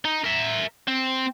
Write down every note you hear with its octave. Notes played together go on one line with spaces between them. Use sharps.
D#4
A#4 E5
C4